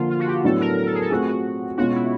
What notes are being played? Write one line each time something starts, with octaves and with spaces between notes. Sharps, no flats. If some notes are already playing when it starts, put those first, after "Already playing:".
Already playing: D3 F3 A#3 F4
F4
F#4
G4
A2 F#3 B3 D4 A4
A#4
A#4
A4
G#4
A4
A3 C4 F4 F#4 G#4
F#4
B2 G#3 C#4 F4 F#4
E4